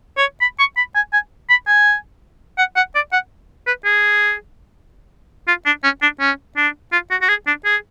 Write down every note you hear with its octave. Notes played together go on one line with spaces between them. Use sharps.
C#5
B5
C#6
B5
G#5
G#5
B5
G#5
F#5
F#5
D5
F#5
B4
G#4
F4
D4
C#4
D4
C#4
D4
F4
F#4
F#4
G#4
D4
G#4